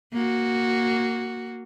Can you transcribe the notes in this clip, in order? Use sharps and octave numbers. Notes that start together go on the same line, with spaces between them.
A#3 F#4